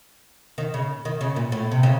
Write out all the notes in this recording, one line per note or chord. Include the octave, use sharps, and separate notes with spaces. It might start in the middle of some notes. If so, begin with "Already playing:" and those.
D#3
C#3
D#3
C#3
A#2
A2
C3
C#3